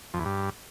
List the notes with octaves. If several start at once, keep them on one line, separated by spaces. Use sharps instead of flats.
F2
E2
G2